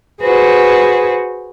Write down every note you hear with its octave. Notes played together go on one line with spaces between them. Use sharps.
F#4 G#4 B4 C5